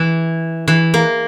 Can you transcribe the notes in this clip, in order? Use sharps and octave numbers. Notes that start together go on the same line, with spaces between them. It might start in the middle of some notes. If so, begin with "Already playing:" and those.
Already playing: E3
E3
A#3